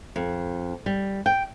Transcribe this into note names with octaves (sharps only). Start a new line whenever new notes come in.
F2
G3
G5